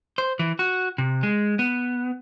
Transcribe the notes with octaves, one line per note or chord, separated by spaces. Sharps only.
C5
E3
F#4
C3
G#3
B3